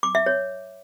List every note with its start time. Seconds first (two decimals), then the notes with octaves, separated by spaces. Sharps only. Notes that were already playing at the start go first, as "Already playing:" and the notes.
0.03 D6
0.15 E5
0.26 C#5